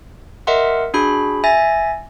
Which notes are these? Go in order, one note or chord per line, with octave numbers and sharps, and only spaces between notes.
A#4 D#5 E5 F#5 C6
D4 F#4 G#4 B5
E5 G#5 A6 A#6